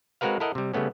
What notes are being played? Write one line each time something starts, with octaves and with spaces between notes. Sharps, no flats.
G#3 C4 F#4 A#4 B4 F5
E4 A4 A#4 D#5 F#5
C3 G3
C#3 G3 A3 B3 C#4